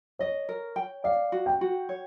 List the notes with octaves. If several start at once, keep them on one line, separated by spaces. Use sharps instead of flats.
C#5 D#5
A#4
G5
D5 F5
F#4
G5
F#4
C#5